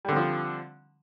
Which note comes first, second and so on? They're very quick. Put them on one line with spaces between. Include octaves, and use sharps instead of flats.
G3 D3 C4 F3